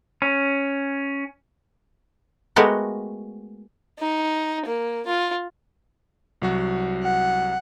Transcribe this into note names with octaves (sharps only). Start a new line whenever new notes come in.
C#4
G#3 A3 B3 F#4 G4 A#4
D#4
A#3
F4
C2 F#3 F#4
F#5